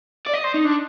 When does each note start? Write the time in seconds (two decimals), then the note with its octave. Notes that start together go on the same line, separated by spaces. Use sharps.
0.26 D5
0.33 D#5
0.44 C5
0.54 D#4
0.64 D4